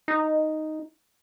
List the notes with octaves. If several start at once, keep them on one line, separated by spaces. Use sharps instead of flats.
D#4